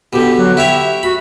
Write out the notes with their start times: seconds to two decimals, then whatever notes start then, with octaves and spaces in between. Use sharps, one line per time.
0.13 B2 D3 G4
0.37 F#3
0.57 E4 G4 C#5 E5
1.03 F#4 B5